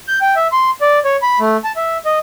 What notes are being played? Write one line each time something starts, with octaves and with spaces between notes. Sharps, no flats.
G6
G5
E5
C6
D5
C#5
B5
A3
A5
E5
D#5